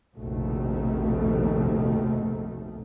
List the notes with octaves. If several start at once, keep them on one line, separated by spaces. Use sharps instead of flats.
F1 A#1 D#2 B2 D#3 A3